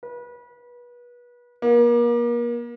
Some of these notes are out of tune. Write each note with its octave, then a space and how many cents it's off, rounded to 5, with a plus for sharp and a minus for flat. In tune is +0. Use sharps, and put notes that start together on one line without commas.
B4 -30
A#3 +35